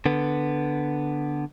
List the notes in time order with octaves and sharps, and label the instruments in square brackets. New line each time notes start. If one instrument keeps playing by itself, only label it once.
[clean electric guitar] D3 B3